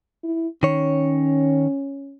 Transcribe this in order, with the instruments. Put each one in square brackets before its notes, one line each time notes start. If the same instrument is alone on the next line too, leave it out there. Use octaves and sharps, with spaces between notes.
[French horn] E4
[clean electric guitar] D#3 C#5 [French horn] C#4